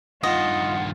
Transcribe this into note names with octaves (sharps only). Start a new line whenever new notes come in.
G2 D#3 F4 D#5 F#5